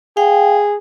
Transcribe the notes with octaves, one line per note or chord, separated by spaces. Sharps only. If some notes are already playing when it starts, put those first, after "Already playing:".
G#4 F5 G5